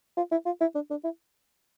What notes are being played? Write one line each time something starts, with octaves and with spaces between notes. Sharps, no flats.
F4
E4
F4
E4
D4
D4
E4